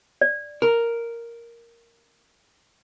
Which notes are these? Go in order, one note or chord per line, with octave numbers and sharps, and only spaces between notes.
D5
A#4